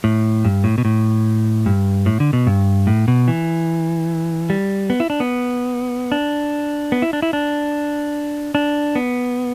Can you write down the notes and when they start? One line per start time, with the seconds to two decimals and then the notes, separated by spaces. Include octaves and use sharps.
0.04 A2
0.45 G2
0.64 A2
0.78 B2
0.85 A2
1.66 G2
2.06 A2
2.20 D3
2.33 B2
2.47 G2
2.87 A2
3.08 B2
3.28 E3
4.50 G3
4.90 B3
5.00 E4
5.10 D4
5.20 B3
6.12 D4
6.92 B3
7.02 E4
7.13 D4
7.22 E4
7.33 D4
8.55 D4
8.95 B3